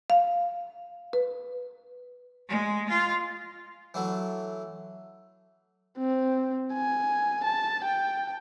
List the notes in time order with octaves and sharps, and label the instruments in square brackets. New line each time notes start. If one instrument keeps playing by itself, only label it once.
[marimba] F5
B4
[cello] G#3
F4
[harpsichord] E3 F#3 A3
[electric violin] C4
G#5
A5
G5